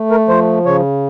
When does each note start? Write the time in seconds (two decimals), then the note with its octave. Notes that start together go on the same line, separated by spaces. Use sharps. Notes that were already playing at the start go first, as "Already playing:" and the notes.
Already playing: A3
0.10 A#4
0.28 F3 C5
0.65 C#3 C#5